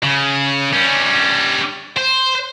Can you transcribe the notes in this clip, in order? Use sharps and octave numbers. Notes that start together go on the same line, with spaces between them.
C#3
G3 C#4
C5